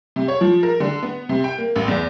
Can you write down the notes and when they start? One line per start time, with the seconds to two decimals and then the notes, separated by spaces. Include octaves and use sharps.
0.16 C3
0.28 C#5
0.41 F3
0.63 A#4
0.80 D3
1.03 B3
1.29 C3
1.44 G5
1.58 A#3
1.76 A1
1.88 E2